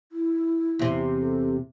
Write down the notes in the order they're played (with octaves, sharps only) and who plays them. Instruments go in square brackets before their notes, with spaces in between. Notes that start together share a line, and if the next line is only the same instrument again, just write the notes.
[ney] E4
[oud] E2 C3
[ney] A4